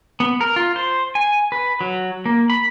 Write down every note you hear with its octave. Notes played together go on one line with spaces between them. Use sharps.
B3
A#4
F4
C5
G#5
B4
F#3
A#3
B5